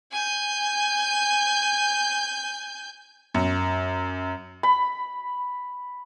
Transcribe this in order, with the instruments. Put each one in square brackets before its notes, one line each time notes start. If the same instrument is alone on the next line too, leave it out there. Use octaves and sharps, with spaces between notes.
[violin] G#5 G6
[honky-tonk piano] F#2
[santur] B5